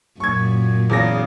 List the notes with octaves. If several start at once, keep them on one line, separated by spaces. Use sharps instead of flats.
F#2 A#2 C#6 G#6
E2 C#3 A#6